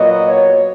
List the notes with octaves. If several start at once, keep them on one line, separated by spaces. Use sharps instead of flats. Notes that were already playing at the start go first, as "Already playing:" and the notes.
Already playing: A#2 F#3 B3 D#5
C#5